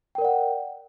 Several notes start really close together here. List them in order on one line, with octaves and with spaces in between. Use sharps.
G5 A#4 D5 F#5